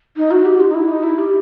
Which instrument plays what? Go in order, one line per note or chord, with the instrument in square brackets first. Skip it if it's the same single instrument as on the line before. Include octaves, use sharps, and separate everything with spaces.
[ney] D#4
F#4
G4
F4
D#4
E4
D#4
E4
G4